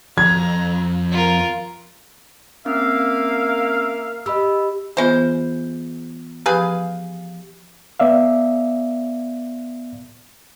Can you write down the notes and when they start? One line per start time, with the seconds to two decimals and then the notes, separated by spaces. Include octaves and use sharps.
0.18 F2 A#5 G#6
1.11 F4 A#4
2.66 A#3 C4 C#4 E5 F5
4.26 G4 D#5 B5 E6
4.97 E3 G#3 B3 F4 C5
6.46 F3 G4 G#4 B4 F5
8.00 B3 D5 E5 F5